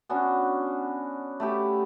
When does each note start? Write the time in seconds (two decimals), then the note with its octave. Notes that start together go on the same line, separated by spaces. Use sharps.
0.09 B3 C#4 D4 F#4
1.40 A3 E4 G4